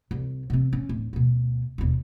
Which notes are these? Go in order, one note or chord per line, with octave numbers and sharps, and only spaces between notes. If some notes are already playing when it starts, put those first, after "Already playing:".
C2
C3 C4
C#4
D1
D2 B2
E1 D#2